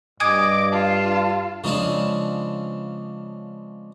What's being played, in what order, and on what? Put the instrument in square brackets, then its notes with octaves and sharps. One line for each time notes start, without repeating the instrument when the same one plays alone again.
[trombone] G2 [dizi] D#5 [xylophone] G#5 D#6 G#6 [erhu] D6
[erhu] F4 [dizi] A5
[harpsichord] C#3 F3 G#3 C4 D4